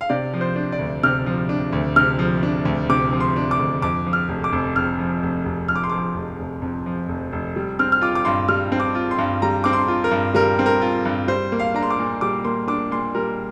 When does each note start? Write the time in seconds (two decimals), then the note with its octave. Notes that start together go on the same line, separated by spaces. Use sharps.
0.01 F5
0.09 C3 D5
0.34 F3
0.41 C5
0.56 D4
0.72 D5
0.79 D2
1.03 C3 F6
1.26 F3
1.49 D4
1.73 D2
1.96 C3 F6
2.19 F3
2.43 D4
2.65 D2
2.89 C3 D6
3.13 F3
3.20 C6
3.36 D4
3.51 D6
3.59 D2
3.82 F2 D6
4.06 F3
4.13 F6
4.29 F1
4.44 D6
4.52 F1
4.76 F2 F6
4.99 F3
5.23 F1
5.45 F1
5.68 F2 F6
5.76 D6
5.84 C6
5.90 F3 D6
6.15 F1
6.39 F1
6.62 F2
6.86 F3
7.08 F1
7.32 F1
7.56 G3
7.79 C4 F6
7.92 F6
8.01 F4 D6
8.15 D6
8.25 G2 C6
8.48 G3 F6
8.72 C4
8.80 D6
8.95 F4
9.11 C6
9.19 G2
9.42 G3 A#5
9.64 C4 D6
9.73 C6
9.88 F4
10.04 A#4
10.11 G2
10.35 G3 A#4
10.59 C4
10.66 A#4
10.82 F4
11.05 G2
11.28 G3 C5
11.52 A#3
11.59 F5
11.74 D4 A#5
11.83 C6
11.90 D6
11.98 A#2
12.21 G3 D6
12.45 A#3 C6
12.68 D4 D6
12.91 A#2 C6
13.15 G3 A#4